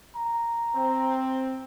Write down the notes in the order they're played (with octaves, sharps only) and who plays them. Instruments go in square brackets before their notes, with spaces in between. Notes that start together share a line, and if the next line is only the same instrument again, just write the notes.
[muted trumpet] A#5
[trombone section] C4